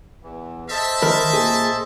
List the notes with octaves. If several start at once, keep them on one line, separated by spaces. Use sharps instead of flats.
E2 E3
A4 C5 D#5 E5 A5
D#3 A#4 B5
A#2 G#4